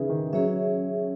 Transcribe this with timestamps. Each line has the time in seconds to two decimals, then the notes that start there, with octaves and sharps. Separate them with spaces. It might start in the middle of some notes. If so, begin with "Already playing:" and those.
Already playing: C#3 E3 D#4 G#4 B4 E5
0.09 D#3
0.33 F#3 C#4 G#4 C#5 E5